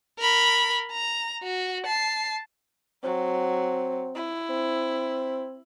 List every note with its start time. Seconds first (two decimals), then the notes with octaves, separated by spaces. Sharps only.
0.19 A#4 B5
0.92 A#5
1.43 F#4
1.86 A5 C7
3.04 F#3 C4
4.15 E4
4.49 C4